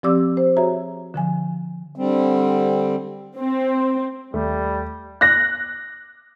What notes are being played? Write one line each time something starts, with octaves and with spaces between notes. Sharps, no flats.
F3 C4 G4 D5 D6 E6
C5
F#4 G#4 C#5 E5 A#5
D3 F3 G#5
D3 G3 C4
C4
D#2 G3 A3
F#6 A#6